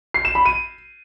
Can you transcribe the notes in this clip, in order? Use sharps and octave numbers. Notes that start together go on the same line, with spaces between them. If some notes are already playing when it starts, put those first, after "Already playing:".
C7
E7
B5
D#7